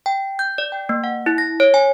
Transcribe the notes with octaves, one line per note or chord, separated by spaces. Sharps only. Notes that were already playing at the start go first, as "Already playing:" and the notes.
G5
G6
D5
G5
A#3
F#5
E4
A#6
C#5
G#5